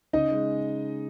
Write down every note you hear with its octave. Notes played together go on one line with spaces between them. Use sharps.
C#3 D#4 D#5
G#3